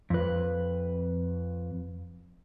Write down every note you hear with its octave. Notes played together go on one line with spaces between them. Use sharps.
F2 B4